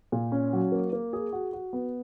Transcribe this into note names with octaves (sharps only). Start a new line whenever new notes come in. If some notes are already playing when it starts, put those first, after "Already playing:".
A#2
C#4
F#3
A#3
A#3
G#4
F#4
F#4
B3